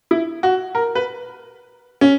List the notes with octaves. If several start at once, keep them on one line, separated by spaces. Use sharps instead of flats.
E4
F#4
A#4
B4
C#4